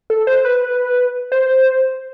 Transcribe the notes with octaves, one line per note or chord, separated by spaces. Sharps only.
A4
C5
B4
C5